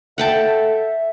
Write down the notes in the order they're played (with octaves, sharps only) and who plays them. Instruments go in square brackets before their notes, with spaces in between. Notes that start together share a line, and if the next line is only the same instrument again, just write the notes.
[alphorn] A4 [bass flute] E5 [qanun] F#5 G5 A5